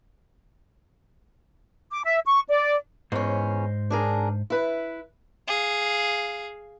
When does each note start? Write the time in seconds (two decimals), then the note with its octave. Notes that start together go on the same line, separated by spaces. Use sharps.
1.91 D6
2.04 E5
2.25 C#6
2.48 D5
3.12 E2 G#2 C#4 C5 D#5
3.90 D4 G#4 A#4
4.50 E4 B4
5.48 G#4 F5